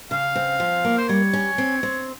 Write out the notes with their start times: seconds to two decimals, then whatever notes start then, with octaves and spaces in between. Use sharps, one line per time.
0.11 C#3 F5
0.35 C4
0.60 F3
0.85 A#3
0.98 C5
1.09 G3 C#5
1.33 C#4
1.58 C4
1.83 C4